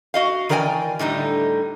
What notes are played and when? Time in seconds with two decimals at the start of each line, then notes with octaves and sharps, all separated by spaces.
0.14 F#4 D#5 F5
0.49 D#3 E3 A#4 D5 G5 G#5
0.99 A2 D3 G3 D#4